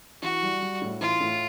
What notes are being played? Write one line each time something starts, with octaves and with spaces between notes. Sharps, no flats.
E3 F#4
G3
G3
A2
E3 F4
A2